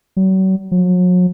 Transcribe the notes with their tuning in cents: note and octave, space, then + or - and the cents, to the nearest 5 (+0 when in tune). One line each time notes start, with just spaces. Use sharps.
F#3 +40
F#3 -40